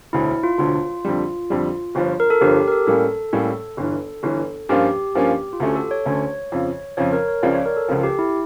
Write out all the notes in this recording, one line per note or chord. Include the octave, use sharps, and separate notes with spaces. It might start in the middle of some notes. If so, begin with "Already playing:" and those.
E1 D2 D3 E4
F4
E1 D2 D3 F4
F2 D3 G3
F2 D3 G3
G1 G2 F3
A#4
A4
G1 G2 F3 G4
G4
A#4
A4
A2 G3 A#3 C#4 A4
A2 G3 A#3 C#4
G1 G2 E3
G1 G2 E3
G2 F3 A#3 C#4 F4 G4
G2 F3 A#3 C#4 F4
F4
D2 D3 A3 C#4 G4
A4
C#5
D2 D3 A3 C#4
F2 C#3 F3
F2 C#3 F3 C#5
A#4
C#5
C#2 C#3 F3 D5
C#5
A#4
A4
C#2 C#3 F3 A4
G4
E4